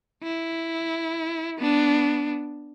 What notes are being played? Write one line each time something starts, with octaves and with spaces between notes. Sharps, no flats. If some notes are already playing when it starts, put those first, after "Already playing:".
E4
B3 D4